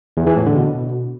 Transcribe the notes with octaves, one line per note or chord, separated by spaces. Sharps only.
E2
E3
A2
D3
B2